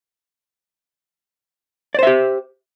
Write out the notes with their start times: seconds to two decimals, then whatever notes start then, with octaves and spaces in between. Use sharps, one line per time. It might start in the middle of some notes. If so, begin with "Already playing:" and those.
1.95 D5
1.99 C5
2.03 E5
2.07 G4